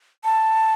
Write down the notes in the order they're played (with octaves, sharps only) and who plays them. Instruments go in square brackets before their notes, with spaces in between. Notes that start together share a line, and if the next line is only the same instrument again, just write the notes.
[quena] A5